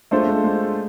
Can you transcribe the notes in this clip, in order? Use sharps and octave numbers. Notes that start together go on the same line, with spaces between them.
G#3 A3 D4 F4 A4 C5
G#3
G#3